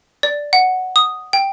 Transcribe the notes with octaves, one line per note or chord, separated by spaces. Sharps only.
D5
F#5
D#6
G5